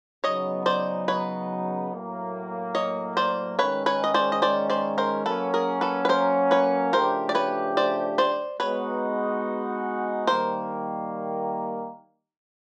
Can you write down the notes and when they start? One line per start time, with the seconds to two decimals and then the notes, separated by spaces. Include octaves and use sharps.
0.24 C#3 F#3 B3 D#4 C#5 D#5
0.66 C5 D5
1.08 B4 C#5
1.92 A2 F#3 A#3
2.75 C#5 D#5
3.17 C5 D5
3.59 D#3 G#3 C#4 B4 C#5
3.86 B4 C#5
4.04 D#5
4.14 C5 D5
4.32 D#5
4.42 C5 D5
4.70 C5 D5
4.98 A#4 C5
5.25 F#3 A#3 C#4 A4 B4
5.54 G#4 A#4
5.81 A4 B4
6.05 B4
6.09 A#4 C5
6.51 B4 C#5
6.93 C#3 F3 A3 D4 G4 A#4 C5
7.29 D5
7.35 B4 C#5
7.77 C5 D5
8.18 C5 D5
8.60 G#3 B3 D#4 F#4 B4 C#5
10.27 D#3 G3 A#3 A#4 C5